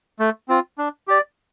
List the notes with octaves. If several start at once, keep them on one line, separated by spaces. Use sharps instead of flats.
A3
C4 F4
D4
G4 D5